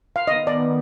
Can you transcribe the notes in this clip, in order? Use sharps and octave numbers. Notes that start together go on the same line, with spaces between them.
F5
D#3 B3 D#5
D5